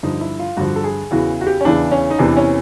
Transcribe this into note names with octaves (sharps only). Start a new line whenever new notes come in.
G2 D3 F3 D#4
E4
F4
G2 D3 F3 F#4
A4
G#4
E2 C#3 E3 F#4
F#4
G4
C#4
E2 C#3 E3 D4
C#4
D#4
E2 C3 E3 D4
C#4